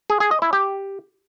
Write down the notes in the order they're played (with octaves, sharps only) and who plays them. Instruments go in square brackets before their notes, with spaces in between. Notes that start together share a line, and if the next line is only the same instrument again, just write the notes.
[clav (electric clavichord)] G#4
G#4
D#5
E4
G4